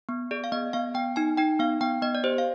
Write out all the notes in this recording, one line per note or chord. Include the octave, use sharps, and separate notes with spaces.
B3
G#4 D5
F5
B3 D#5
B3 F5
B3 G5
D#4 G#5
D#4 G5
B3 F5
B3 G5
B3 D#5
D5
G4 C5
F5